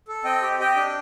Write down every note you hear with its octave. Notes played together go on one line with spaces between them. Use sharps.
A4
C4 D#5 G5
G4
G4 D#5 G5
D4